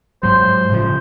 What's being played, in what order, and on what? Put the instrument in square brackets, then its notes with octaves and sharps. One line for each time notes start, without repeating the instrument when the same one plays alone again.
[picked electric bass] G#2 F#3 [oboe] C5
[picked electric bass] A2 C#3 F3